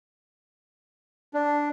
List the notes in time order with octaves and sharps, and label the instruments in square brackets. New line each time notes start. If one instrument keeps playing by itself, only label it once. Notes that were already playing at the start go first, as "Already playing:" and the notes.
[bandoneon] D4